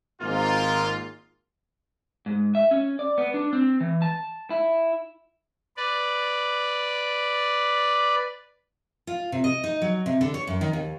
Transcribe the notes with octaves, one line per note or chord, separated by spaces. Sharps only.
G#1 G#2 A#3 F4
G#2
E5
C#4
D5
B3
D4
C4
E3
A5
E4
B4 D5
F4
C3
D#5
D#4
F#3
C3
D3
C#5
F#2
D#3
D#2